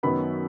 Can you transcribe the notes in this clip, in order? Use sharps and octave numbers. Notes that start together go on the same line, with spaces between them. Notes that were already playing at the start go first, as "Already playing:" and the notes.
F#2 D#3 F#3 B3 B5